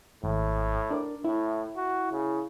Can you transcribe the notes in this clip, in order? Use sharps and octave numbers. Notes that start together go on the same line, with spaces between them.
G#1 A2
D4 A#4 D5
A2 E4
F#4
C#3